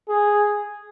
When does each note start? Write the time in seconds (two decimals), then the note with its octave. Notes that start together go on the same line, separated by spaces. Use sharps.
0.09 G#4